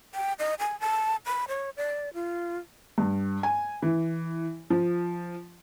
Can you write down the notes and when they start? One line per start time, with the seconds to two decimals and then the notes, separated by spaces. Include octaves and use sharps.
0.15 G5
0.39 D#5
0.59 G#5
0.80 A5
1.26 B5
1.48 C#5
1.77 D5
2.14 F4
2.98 G2
3.43 G#5
3.82 E3
4.70 F3